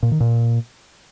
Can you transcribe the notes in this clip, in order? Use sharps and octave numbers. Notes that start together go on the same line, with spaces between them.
A#2
D#3
A#2